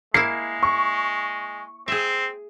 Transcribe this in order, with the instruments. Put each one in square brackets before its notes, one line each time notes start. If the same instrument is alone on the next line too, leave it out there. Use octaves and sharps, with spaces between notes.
[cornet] G#3 [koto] A#3 E4 [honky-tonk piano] C7
[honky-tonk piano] C#6
[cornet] C4 [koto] G#4 E5